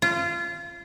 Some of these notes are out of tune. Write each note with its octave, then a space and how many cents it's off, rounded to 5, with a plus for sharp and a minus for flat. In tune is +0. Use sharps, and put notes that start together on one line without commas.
F4 -25